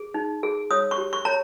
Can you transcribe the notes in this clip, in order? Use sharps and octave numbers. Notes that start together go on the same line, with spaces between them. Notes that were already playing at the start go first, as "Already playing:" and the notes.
Already playing: G#4
D#4
G#4
C#5 D#6
C#6
G4
C#6
C#5 A#5